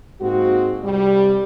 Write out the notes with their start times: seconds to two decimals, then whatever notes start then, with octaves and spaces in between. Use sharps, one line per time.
0.20 G#2 G#3 A#3 C4 F#4
0.83 C2 G3